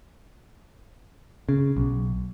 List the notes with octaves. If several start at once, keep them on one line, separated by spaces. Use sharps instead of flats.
C#3
B1